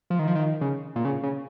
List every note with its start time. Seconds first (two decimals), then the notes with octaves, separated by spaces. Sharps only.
0.10 F3
0.19 D#3
0.28 F3
0.35 D#3
0.61 C#3
0.96 A#2
1.05 C#3
1.23 C#3